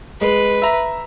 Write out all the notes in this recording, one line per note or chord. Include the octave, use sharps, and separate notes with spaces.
G#3 B4
E5 A#5